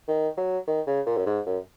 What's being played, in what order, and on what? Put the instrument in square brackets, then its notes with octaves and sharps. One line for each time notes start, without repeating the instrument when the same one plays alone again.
[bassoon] D#3
F#3
D#3
C#3
A#2
F#2
G#2
F#2